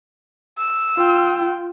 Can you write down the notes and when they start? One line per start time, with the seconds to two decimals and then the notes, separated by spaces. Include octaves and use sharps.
0.58 E6
0.97 F4 G5